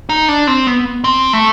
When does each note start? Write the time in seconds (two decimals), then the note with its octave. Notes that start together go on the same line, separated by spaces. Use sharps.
0.09 D#4
0.28 D4
0.47 C4
0.67 B3
1.04 C4
1.33 A3